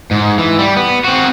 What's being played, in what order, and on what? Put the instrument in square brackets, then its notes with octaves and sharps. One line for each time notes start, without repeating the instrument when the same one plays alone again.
[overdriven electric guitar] G#2
E3
G3
B3
C4 F#4